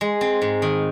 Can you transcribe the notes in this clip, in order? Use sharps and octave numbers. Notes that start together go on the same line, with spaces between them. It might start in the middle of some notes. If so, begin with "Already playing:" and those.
G#3
C4
G#2
D#3